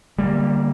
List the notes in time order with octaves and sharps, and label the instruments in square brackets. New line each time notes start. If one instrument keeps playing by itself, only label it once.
[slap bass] D3 G3 A#3